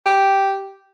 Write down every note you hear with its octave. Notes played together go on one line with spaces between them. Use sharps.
G4